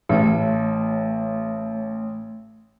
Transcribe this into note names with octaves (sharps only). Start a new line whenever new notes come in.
A1 A3 C#5